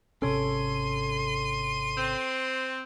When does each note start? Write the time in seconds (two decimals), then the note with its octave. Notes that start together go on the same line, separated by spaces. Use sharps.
0.22 G#1 C3 C#4 A4 C#5 C6 D#7
1.97 C4